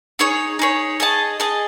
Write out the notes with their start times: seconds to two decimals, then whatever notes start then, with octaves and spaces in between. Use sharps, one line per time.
0.19 D#4 G#4 C#5
0.59 D#4 G#4 C#5
1.00 G#4 D#5 A5
1.40 G#4 D#5 A5